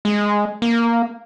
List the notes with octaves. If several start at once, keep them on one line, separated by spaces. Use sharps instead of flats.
G#3
A#3